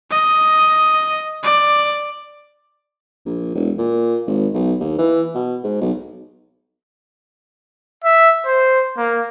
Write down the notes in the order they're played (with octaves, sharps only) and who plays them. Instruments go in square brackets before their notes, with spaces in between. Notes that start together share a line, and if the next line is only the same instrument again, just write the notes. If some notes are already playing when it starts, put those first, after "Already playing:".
[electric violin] D#5
D5
[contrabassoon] A#1
E1
A#2
G#1
B1
D#2
E3
B2
G#2
B1
[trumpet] E5
C5
A#3